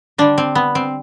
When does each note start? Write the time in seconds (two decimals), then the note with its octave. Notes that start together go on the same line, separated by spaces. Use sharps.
0.18 D3 G3 D4
0.38 C4
0.55 B3
0.75 C4